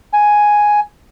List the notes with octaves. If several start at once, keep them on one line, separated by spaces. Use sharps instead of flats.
G#5